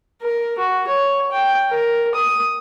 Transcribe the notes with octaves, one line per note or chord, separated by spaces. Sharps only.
A#4
F#4
C#5
G5
A#4
D#6